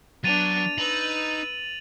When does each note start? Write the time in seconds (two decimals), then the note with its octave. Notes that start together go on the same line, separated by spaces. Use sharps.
0.24 F#3 B3 D4 A6 D#7 F7
0.78 D#4 B4 E6 F#7